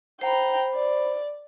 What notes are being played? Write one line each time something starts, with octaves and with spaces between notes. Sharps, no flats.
C5 G5 A#5 B5
D5